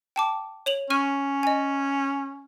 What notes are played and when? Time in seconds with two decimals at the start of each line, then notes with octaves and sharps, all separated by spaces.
0.16 G5 A5 D6
0.66 C#5 F7 F#7
0.90 C#4 C#6 F6 D#7
1.43 D#5 G#5